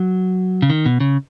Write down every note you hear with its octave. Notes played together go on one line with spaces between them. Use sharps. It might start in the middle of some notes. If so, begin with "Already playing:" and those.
Already playing: F#3
C#3
D#3
B2
C#3